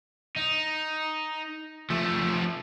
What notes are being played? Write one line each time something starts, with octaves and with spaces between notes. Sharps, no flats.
D#4
F3 A3